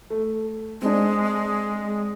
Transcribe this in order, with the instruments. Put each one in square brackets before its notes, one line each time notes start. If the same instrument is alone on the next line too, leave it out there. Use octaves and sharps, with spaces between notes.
[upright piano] A3
[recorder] G#3 [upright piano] C4 D4